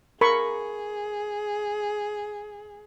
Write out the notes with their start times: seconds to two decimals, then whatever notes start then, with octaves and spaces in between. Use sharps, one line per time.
0.21 G#4 A#4 B5 C#6